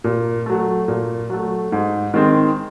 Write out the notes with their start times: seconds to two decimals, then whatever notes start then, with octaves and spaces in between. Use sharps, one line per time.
0.04 A#2
0.46 F#3 A3
0.88 A#2
1.30 F#3 A3
1.72 G#2
2.14 D#3 G#3 C4